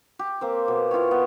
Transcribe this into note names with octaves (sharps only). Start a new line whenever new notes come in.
G4
A#3 C4 C5
B2
E4 F4 G4 C#5
B3